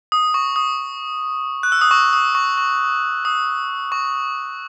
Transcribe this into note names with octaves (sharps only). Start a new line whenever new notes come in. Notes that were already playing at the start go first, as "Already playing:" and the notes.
D#6
C#6
D#6
F#6
E6
D#6
C#6
D#6
C#6
C#6
D#6
C#6